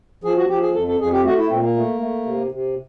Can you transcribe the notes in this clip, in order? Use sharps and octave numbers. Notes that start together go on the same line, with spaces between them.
F3 G#4
F#4
F3 G4
G#4
F2 A4
A4
F2 G#4
G4
A3 F#4
E4
A#2 C4
A#3
A3
A3
C3
C3